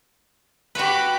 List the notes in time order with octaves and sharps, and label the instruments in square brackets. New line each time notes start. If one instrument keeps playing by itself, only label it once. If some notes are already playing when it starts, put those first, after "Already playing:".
[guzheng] F#4 B4 [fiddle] G4 B5